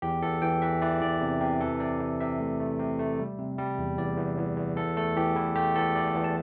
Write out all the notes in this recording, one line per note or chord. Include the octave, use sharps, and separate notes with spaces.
E2 G4
E2 A4
E3 G5
E3 E5
E3 D5
E2 D5
C3
C3 G4
E3 A4
C3 D5
C3
C3 E5
A3
A3
C3
A3
G3
C3
G3
E2
E2 D5
E2
E2
E2
E2 A4
A3 A4
E3 G4
E2 E4
A3 G4
E2 A4
E2 D5
E2
A5